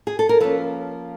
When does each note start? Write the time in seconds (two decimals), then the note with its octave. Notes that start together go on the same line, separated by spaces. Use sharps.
0.07 G#4
0.19 A4
0.29 A#4
0.40 F3 A#3 C#4 A4 B4